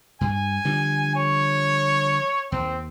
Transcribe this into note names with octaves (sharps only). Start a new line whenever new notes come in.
G2 G#5
D3 F3 G3
C#5
D#2 C4